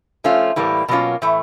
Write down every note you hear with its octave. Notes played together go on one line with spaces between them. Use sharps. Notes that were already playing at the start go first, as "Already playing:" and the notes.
F3 A3 C#4 F4
A2 E3 G3 A#3
B2 F#3 A#3 C#4 F4
A2 E3 A3